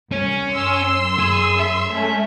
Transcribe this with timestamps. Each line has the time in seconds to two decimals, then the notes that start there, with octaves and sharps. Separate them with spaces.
0.12 C2 C#4
0.49 F#2 C6 E6
1.20 G#4
1.60 E5
1.91 G#3 A3 C#4